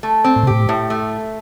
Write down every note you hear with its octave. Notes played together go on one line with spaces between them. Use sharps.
A3
C4
A2
C3
A2 G4
A2
A3